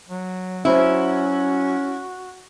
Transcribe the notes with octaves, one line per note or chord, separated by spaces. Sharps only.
F#3
F#3 C#4 E4 F#4 C5 E5